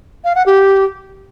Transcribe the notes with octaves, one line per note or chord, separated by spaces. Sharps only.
F5
F#5
G4